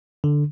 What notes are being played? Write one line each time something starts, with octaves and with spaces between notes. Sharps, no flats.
D3